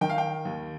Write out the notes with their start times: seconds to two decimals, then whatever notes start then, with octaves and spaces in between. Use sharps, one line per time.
0.01 D#3 G5
0.10 F5
0.18 G5
0.45 D#2